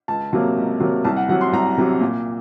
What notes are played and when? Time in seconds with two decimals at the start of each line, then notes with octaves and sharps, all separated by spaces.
0.08 C#2 A5
0.33 C3 F#3 A#3
0.57 C#2
0.80 C3 F#3 A#3
1.04 C2 A5
1.16 F#5
1.28 C3 F#3 F#5
1.41 C6
1.53 C2 A#5
1.77 C3 F#3
2.01 A#2